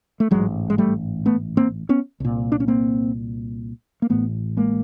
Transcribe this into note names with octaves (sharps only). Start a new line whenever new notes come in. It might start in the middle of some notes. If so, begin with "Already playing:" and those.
A3
A1 G#2 F#3 G#3
G#3
G3 A3
A3 B3
A#3 C4
B3 C#4
C2 A#2
D4
C#4
A#3 C4
A#3
A1 A2 A3 B3
G#3 A#3